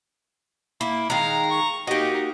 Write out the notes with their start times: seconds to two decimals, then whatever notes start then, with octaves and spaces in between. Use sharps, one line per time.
0.81 A#3 E4
1.10 D#3 G#3 F5 A#5
1.50 C#6
1.87 A#3 D#4 F#4 G4 D#5